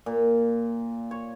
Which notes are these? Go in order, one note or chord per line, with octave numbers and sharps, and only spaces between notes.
A#2
C#5